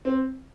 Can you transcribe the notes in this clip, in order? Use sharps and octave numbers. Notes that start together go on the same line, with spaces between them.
C4